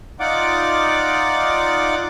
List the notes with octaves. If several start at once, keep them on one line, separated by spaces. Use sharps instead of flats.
D#4 F4 D5 F#5 D6